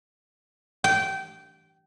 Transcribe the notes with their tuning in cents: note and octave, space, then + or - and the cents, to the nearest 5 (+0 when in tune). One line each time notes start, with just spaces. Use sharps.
G5 -20